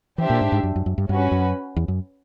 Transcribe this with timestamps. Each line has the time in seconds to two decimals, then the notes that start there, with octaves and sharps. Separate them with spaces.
0.18 E3 D4 G4 C5 E5
0.30 A#2
0.41 G#2
0.52 G#2
0.63 F#2
0.76 F#2
0.86 F#2
0.98 G2
1.09 G2 C#4 F#4 B4
1.32 F#2
1.76 E2
1.88 F#2